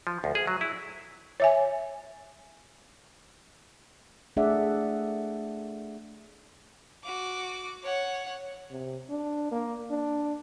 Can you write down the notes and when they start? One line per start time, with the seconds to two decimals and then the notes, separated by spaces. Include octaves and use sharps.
0.07 F3
0.24 D2
0.35 G#4
0.47 F#3
0.61 E4
1.40 C#5 E5 G#5
4.37 A3 D4 G#4 D5 E5 F#5
7.04 F#4 D6
7.83 C#5 F#5
8.71 C3
9.09 D4
9.52 A#3
9.91 D4